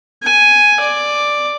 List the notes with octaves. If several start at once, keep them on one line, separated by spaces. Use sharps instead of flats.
G#5
D5